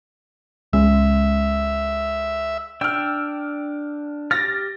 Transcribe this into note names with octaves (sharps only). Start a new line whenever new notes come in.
C#2 G#3 C#4 E5
D4 G5 E6 F6
G4 F6 A6 A#6